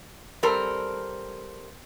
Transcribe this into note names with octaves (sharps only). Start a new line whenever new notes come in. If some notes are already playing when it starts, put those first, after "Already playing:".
G3 C4 A4 A#4